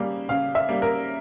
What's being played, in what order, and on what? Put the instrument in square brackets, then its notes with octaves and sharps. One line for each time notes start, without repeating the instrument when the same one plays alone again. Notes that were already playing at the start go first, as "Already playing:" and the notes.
Already playing: [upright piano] C#3 G3 A#3
C#3 F5
E5
G3 A#3
A#4